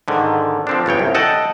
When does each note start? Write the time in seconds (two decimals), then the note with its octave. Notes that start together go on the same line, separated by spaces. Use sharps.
0.08 G#2 D3 D#3
0.67 F3 C4 D4
0.86 G1 C#3 C#5 G5
0.99 C2
1.14 A4 D#5 F#5 G5 A5